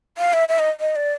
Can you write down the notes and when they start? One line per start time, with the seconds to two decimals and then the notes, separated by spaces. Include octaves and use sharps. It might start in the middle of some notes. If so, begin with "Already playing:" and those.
0.18 F5
0.33 E5
0.49 E5
0.59 D#5
0.80 D#5
0.96 D5